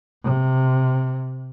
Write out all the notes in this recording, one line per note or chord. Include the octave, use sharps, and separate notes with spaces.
C3